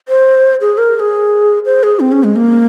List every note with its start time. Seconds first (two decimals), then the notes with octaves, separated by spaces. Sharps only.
0.08 C5
0.61 G#4
0.78 A#4
0.96 A#4
1.00 G#4
1.65 C5
1.83 G#4
2.00 C4
2.12 C#4
2.24 G#3
2.36 A#3